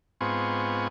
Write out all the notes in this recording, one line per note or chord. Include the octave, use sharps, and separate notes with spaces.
G#2 B3 C4 F4 G#5 C#6